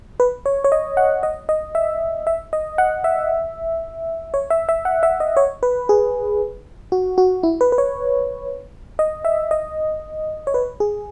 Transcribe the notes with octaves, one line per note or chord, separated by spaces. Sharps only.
B4
C#5
C#5
D#5
F#5
D#5
D#5
E5
E5
D#5
F#5
E5
C#5
E5
E5
F#5
E5
D#5
C#5
B4
G#4
F#4
F#4
E4
B4
B4
C#5
D#5
E5
D#5
C#5
B4
G#4